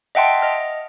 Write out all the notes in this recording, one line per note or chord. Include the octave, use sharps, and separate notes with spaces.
D#5 E5 F#5 G5 A5 C6
D#5 F6